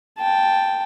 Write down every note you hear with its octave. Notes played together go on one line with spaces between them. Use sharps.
G5 A5